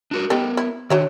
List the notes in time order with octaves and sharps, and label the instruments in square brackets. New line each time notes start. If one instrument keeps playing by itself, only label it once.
[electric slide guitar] D4 F#4 A#4
[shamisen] D#3 G4 A4 [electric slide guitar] B3 A#4
[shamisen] E4
[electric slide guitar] D#3 D4 [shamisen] F#4 C#5 E5